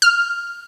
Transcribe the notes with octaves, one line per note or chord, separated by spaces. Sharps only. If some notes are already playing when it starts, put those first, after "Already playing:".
F6